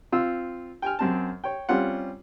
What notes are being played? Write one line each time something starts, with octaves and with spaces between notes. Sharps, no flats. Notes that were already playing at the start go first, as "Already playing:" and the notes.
C4 F4 E6
G5 G#5 F6
F#2 C4 A5
C#5 G5
G3 C4 C#4 F4 F#5